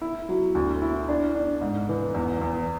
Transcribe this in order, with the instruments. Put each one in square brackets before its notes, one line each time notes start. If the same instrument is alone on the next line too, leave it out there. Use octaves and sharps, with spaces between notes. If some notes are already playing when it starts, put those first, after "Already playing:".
[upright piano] E4
F#3
D2
E4
D4
D4
G#2
E3
E2
E2